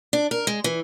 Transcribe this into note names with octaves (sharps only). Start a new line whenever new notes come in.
D4
A#4
G#3
E3